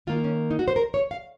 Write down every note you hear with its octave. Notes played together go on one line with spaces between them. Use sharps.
D#3 A#3 F4
C#4
D#4
F#4
C5
A#4
C#5
F5